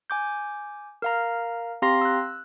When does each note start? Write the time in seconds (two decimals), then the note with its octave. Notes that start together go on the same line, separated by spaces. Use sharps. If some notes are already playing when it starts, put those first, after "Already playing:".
0.10 G#5 D6 G6
1.02 A#4 F5 A#5
1.82 C4 G4 F5 A#5 C6 A#6
2.01 E6 F#6